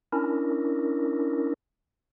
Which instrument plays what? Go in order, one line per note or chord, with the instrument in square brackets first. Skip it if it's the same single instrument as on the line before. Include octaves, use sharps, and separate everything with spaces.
[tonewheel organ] C#4 D4 E4 A#4